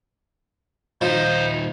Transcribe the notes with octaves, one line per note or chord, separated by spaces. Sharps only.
A#2 D#3 F3 D#4 C5 D#5